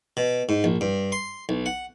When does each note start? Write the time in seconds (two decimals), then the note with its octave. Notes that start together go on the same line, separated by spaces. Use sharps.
0.17 B2
0.49 G#2
0.64 A#1
0.81 G2
1.12 C6
1.49 B1
1.66 F#5